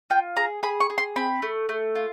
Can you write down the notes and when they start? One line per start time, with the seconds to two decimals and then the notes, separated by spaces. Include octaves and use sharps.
0.10 F4 G5
0.36 G#4 A#5
0.63 G#4 B5
0.80 C#6
0.90 G#4
0.98 C6
1.16 C4 B5
1.42 A3
1.69 A3
1.95 F4